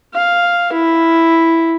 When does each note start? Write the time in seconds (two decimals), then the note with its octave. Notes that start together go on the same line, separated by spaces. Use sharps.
0.14 F5
0.73 E4